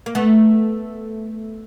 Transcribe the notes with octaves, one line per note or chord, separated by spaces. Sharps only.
A#3
A3 B3